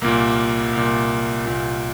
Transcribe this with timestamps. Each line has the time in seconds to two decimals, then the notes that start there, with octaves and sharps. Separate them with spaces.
0.01 C2 A#2 A#3
0.73 C2 A#2
1.46 C2 A#2